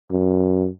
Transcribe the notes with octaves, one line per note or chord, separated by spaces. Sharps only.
F#2